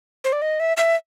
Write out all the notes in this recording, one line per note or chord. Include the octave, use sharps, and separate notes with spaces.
C5
D5
D#5
E5
E5